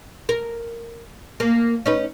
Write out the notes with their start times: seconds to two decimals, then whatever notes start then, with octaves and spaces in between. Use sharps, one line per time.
0.29 A#4
1.40 A#3
1.86 C#4 D#4 B4